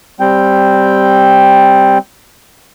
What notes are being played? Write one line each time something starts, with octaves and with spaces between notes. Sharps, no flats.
G3 C4 G5